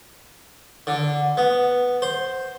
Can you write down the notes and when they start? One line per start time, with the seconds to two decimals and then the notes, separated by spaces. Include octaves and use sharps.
0.87 D3
1.37 B3
2.02 C5